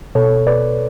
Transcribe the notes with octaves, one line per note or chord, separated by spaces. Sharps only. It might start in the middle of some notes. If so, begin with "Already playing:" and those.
B2 A4 C#5
B2 B4 D5